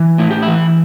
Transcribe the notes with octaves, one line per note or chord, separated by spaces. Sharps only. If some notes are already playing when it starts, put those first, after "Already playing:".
Already playing: E3
A2 E4
G4
E4
E3